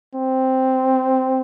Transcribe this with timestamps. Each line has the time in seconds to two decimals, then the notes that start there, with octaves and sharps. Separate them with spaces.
0.15 C4